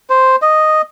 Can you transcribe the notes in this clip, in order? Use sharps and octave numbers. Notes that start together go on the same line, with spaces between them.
C5
D#5